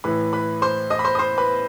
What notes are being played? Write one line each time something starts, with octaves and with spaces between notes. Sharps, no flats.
A2 E3 B4 B5
B4 B5
C5 C6
D#5 D#6
B5
C5 C6
D#6
C5 C6
B4 B5